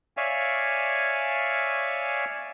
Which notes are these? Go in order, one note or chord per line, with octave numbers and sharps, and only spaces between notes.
C#5 D5 E5 F5 G#5